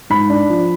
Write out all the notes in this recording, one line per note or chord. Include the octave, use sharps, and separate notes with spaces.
G#2 B5
D4
F3